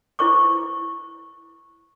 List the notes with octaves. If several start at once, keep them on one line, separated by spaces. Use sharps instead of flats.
E4 B4 C5 C#6 D6